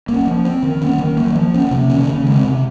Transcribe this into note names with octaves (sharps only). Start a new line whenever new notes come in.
A#3 C#4
F3
C4
D#3
A#3 C#4
D#3
F#3 A#3
F3
A#3 C#4
C3
D#3 A#3 C#4
C#3
G#3 C4
C3